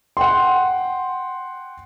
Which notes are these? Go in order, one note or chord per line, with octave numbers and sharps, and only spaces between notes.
F#5 G5 C6